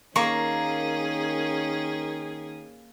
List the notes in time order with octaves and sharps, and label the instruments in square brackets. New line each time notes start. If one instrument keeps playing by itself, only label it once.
[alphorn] D#3 [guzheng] A#3 [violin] C#4 G#4 [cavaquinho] C#6